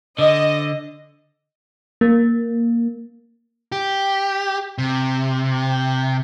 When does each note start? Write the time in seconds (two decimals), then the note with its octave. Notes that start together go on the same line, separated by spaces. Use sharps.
0.19 D3 D#5
2.01 A#3
3.72 G4
4.78 C3